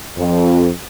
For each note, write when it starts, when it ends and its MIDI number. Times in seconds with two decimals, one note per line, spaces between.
0.17 0.69 41